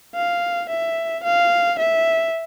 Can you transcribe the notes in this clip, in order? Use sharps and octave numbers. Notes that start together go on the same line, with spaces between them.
F5
E5
F5
E5